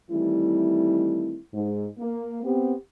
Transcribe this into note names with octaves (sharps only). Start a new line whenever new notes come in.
D#3 E3 G3 A3 C4 E4
G#2
A#3
B3 C4 G4